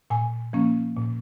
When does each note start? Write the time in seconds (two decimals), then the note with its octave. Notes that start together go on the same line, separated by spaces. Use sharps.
0.10 A#2 G#5
0.53 F3 A#3 C#4
0.96 A#2